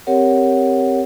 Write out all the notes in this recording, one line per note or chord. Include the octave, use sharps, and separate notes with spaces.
C4 G4 A#4 C#5 F#5